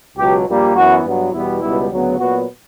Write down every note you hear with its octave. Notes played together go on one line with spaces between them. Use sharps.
C#2 B2 F#3 G4
A#1 A#2 G3 A#3
F#2 E3 B3 F#4
G2 F#3 B3
E2 B2 G3 B3 E4
C#2 B2 G3 B3 E4
D2 C#3 F#3 B3
A#2 F#3 B3 F#4